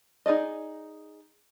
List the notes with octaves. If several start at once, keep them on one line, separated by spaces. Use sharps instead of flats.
D#4 G#4 D5 D#5